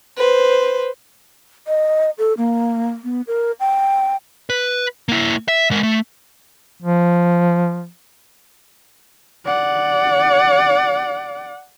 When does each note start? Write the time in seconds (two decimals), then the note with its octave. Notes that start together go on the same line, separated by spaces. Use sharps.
0.17 B4 C5
1.67 D#5
2.18 A4
2.37 A#3
3.04 B3
3.27 A#4
3.60 G5
4.50 B4
5.09 A#3 E4
5.48 E5
5.71 G#3 A#4
5.83 A3
6.82 F3
9.46 D5 F#5